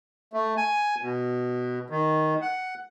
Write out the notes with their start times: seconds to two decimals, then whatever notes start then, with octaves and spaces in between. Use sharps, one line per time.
0.33 A3
0.57 G#5
1.02 B2
1.90 D#3
2.42 F#5